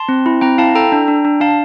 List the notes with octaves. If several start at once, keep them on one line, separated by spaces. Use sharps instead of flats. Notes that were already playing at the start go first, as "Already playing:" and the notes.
Already playing: A5 C6
C4
E4
C4 G5 A#5
E4 F5 A5
A4 G5 A#5
D4
D4
D4
D4 F5 A5